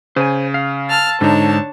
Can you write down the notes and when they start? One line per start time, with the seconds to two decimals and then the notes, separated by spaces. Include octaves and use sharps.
0.16 C#3 C5 G#5
0.54 F5
0.89 A5 E6 F6
1.21 G#2 D3 D4 D#4 C#5 A5